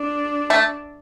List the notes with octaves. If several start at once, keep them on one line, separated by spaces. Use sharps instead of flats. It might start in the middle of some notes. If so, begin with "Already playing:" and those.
Already playing: D4
A3